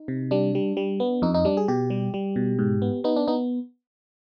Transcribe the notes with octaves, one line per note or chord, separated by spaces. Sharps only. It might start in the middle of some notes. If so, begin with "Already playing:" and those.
Already playing: D#4
C3
G3 D4
G3
G3
B3
F2 D#4
D#4
G3 D4
G#4
B2 G4
G3
G3
B2
G#2
B3
B3 D#4
D4
B3 D#4